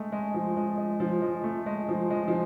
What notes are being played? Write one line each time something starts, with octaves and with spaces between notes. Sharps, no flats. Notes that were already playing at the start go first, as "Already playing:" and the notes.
Already playing: G#3 A3
G#3
F3
G#3
G#3
F3
G#3
A3
G#3
F3
G#3
F3